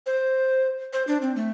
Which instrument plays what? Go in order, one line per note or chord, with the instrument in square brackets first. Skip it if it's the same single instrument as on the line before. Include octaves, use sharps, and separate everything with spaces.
[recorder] C5
C5
D4
C4
A3